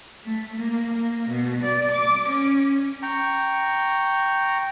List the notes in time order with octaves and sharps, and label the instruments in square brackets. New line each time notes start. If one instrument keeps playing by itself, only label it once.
[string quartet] A3
A#3
A#3
B2
D5
D6
C#4
[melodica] G5 A#5 C#6